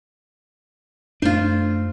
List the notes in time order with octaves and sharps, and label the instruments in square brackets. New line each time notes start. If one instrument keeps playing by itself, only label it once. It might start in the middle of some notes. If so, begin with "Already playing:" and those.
[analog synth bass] F#2 [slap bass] A3 D4 [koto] F4 C5